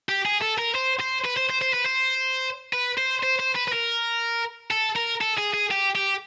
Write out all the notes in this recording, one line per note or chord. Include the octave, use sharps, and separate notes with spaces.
G4
G#4
A4
A#4
C5
C5
B4
C5
C5
C5
B4
C5
B4
C5
C5
C5
B4
B4
A#4
A4
A#4
A4
G#4
G#4
G4
G4